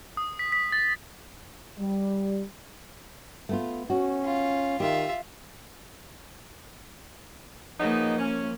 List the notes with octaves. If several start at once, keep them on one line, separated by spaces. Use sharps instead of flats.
D#6
B6
B6
A6
G3
A3 B3 F4
C#4 F#4
F4
D#3 F4 G4 E5
C#3 F3 A#3 B3 D#4
C#4